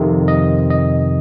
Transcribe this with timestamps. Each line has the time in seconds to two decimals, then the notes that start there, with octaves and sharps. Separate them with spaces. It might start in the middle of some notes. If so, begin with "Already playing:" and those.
Already playing: F2 C3 D#3
0.28 D#5
0.70 D#5